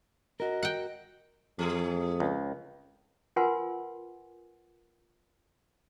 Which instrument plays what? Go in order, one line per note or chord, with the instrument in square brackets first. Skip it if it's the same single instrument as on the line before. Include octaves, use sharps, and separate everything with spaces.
[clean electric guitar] F#4 A#4 [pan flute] D#5
[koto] F#5 G5
[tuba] F2 [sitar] E3 A3 G#4
[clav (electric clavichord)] C#2
[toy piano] F4 A#4 B4 F#5 G#5 C6